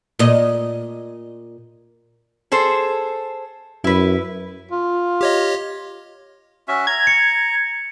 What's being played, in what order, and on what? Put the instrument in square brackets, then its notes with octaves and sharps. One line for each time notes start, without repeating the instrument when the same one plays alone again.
[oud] A#2 D#5
[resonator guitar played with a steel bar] G#4 A4 C5
[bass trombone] F#2 [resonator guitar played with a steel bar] E4 B4
[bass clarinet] F4
[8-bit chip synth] G4 C#5 D#5
[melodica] C#4 F#4 E5
[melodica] A#5 [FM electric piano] G#6
[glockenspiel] C#7